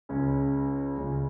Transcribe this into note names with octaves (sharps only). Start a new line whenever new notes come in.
C#2 C#3 G#3 C#4
C#2 C#3 G#3 C#4